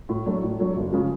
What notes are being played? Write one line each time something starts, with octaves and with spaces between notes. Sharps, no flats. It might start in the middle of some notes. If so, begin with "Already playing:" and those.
A2
F#3 A3 D4
A2
F#3 A3 D4
F#1
C#3 F3 G#3